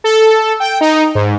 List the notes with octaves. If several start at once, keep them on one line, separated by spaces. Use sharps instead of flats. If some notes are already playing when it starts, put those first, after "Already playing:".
A4
G5
D#4
G#2